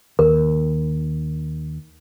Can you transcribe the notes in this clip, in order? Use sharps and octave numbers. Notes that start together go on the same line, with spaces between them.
D#2 A#4